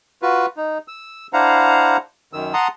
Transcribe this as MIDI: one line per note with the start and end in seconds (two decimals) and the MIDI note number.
0.22 0.46 65
0.22 0.46 66
0.22 0.46 71
0.57 0.78 63
0.88 1.27 88
1.33 1.97 62
1.33 1.97 64
1.33 1.97 72
1.33 1.97 77
1.33 1.97 78
1.33 1.97 82
2.33 2.54 42
2.33 2.54 51
2.33 2.54 88
2.54 2.68 78
2.54 2.68 81
2.54 2.68 82
2.54 2.68 84
2.54 2.68 87